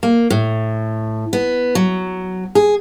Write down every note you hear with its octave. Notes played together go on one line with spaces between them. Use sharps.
A#3
A2
B3
F#3
G#4